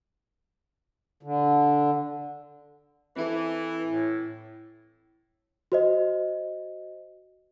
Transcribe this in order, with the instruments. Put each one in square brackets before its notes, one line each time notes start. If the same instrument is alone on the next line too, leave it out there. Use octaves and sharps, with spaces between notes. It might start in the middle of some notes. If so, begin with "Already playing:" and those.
[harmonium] D3
[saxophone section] E3 [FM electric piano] C4 E4 A4
[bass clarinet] A2
[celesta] F#4 C5 D#5